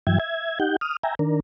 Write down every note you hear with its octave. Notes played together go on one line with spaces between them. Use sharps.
G2 E3 F#3 E5 G5 G#6
E5 G#6
D#4 G4 F#5 G6
D#6 F6
E5 G5 G#5 A#5
D#3 D4 A#4